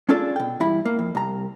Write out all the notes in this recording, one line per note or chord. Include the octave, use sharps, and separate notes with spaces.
C#4 D4 F4 G#4 A4 D5
B2 G5
E2 G2 E4 B5
A#3
F2
C2 A#5